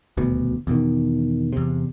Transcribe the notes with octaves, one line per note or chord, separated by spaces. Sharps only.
D#1 D2 B2
E2 B2 D#3
E2 C3